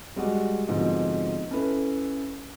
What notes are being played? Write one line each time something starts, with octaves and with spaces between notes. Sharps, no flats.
G3 G#3 F#4
G#2 B2 D3 F3 C4
C#4 E4 A4 B4